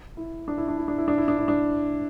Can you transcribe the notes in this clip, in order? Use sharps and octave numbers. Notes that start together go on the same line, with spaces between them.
E4
D4
E4
D4
E4
D4
E4
D4
E4
D4
E4
D4